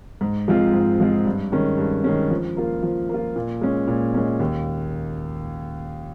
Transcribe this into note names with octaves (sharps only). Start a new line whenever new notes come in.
G#2
F3 G#3 C4 F4
G#2
F3 G#3 C4 F4
G2
D#3 G#3 C#4
G2
D#3 G#3 C#4
F3
A#3 F4
F3
A#3 F4
A#2
G#3 C#4
A#2
G#3 C#4
D#2